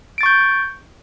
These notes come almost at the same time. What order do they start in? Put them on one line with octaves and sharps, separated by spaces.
D7 A6 C#6 G6